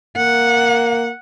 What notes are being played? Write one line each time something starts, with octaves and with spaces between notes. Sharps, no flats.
A#3 F#5